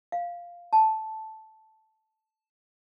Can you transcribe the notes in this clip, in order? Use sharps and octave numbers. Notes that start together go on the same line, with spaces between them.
F5
A5